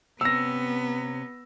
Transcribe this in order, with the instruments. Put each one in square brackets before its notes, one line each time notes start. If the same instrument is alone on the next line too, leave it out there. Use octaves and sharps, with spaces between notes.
[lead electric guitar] C3 C#4 [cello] B3 [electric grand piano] E6 A#6